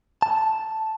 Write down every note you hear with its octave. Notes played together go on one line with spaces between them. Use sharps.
A5